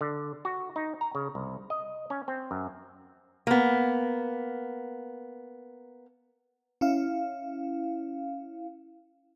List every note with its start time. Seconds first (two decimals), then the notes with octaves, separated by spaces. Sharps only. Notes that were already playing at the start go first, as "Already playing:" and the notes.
0.01 D3
0.45 F#4
0.76 D#4
1.01 A#5
1.15 C#3
1.35 C2
1.70 D#5
2.10 C#4
2.28 C4
2.51 F#2
3.47 A#3 B3
6.81 C#4 E4 F5